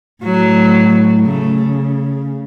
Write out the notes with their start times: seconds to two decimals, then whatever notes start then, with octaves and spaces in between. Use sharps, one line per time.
0.23 A2 F#3
1.25 C#3 A3